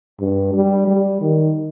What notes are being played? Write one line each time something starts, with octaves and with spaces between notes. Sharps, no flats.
G2
G3
G3
D#3